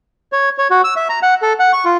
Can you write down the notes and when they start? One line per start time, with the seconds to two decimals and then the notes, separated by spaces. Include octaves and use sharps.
0.32 C#5
0.58 C#5
0.70 F#4
0.84 E6
0.96 E5
1.09 A#5
1.22 F#5
1.42 A4
1.59 F#5
1.73 C#6
1.85 F4